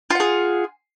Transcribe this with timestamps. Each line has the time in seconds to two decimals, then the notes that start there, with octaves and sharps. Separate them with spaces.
0.10 F4
0.15 F#5
0.20 G#4